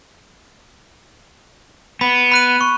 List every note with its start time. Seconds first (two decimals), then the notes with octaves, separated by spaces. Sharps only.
2.01 B3 B5
2.32 B5 F#6 D#7
2.61 C#6